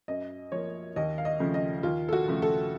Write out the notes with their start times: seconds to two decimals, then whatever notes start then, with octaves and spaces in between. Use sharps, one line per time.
0.08 F#2 D#5
0.52 F3 A#3 C#5
0.96 D#2 D#5
1.18 F5
1.25 D#5
1.40 C#3 F3 A3
1.54 D#5
1.83 D#2 F4
2.09 A4
2.13 F#4
2.27 C#3 F3 A3
2.42 A4